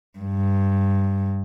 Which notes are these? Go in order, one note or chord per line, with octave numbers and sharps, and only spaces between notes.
G2